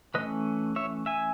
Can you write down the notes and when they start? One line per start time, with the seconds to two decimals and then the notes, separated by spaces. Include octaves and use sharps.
0.14 E3 A3 C#4 B4 D#5
0.76 C#5 E5
1.06 E5 G#5